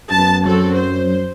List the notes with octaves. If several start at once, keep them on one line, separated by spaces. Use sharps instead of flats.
F#2 B3 A5
F#3 C4 F#4 A4
C5